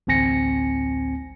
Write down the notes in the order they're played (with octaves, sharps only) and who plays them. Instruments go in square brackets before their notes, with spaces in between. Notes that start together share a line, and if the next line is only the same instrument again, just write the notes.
[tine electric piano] A1 D2 C4 G#5 A#6 C#7